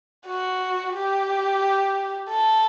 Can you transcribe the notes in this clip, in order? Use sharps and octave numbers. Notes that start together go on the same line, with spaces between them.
F#4
G4
A4